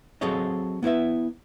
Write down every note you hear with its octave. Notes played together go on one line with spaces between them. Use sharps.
F#3 C4 G#4 A4 C#5 D#5
B3 E4 B4 E5